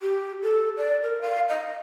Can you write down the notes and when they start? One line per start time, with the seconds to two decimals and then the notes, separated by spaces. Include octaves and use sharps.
0.01 G4
0.42 A4
0.77 D5
1.03 A#4
1.21 F5
1.49 D#5